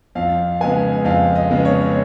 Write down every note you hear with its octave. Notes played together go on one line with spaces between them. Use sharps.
F2 F5
C#3 G#3 B3 G#5
F2 F5
D#5
C#3 G#3 B3
C#5